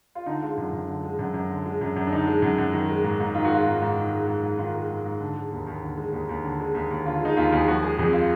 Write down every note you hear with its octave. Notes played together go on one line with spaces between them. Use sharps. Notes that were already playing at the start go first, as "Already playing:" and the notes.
F4
D3 D#4
G#3 F4
F#2
F#2
D3
G#3
F#2
F#2
D3
G#3
F#2
F#2
D4
D3 D#4
G#3
F#2
F#2
D#3
G#3
G#2
G#2
D#3 F4
F#4
G#3 F4
G#2
G#2
D#3
G#3
G#2
G#2
D#3 F4
G#3
G#2
G#2
D3
G#3
D#2
D#2
D3
G#3
D#2
D#2
D3
G#3
D#2
D#2
D3 F4
G#3 D#4
D#2 F4
D#2
G#4
F3 F#4
G#3 G#4
F2 G#4
F4